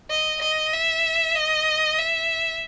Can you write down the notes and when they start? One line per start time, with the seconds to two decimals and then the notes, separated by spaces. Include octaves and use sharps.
0.10 D#5
0.42 D#5
0.73 E5
1.36 D#5
1.99 E5